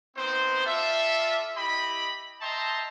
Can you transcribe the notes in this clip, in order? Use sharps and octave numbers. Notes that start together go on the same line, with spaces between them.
B3 C4 D#4 C5
F4 A4 D5 E5
E4 G4 D#5 B5
D#5 E5 G5 A5 A#5 C6